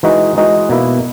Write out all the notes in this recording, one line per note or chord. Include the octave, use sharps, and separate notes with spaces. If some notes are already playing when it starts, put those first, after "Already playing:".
E3 G#3 D#4 F#4
E3 G#3 D#4 F#4
B2 A#3 E4